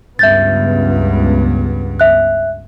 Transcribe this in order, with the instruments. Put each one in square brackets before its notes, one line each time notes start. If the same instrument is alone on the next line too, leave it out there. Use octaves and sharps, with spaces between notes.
[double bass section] C#2 B3 [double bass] G2 [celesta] E5 G6 A6
[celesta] E5 F#6